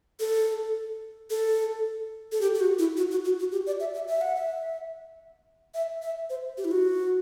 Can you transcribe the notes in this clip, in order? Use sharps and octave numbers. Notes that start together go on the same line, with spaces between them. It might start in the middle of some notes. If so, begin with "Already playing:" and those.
A4
A4
A4
G4
G4
F#4
E4
F#4
F#4
F#4
F#4
G4
D5
E5
E5
E5
F#5
E5
E5
E5
C5
G4
E4
F#4